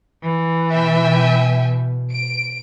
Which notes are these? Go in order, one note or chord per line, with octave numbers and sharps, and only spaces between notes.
E3
B2 E5 G5 G#5
D7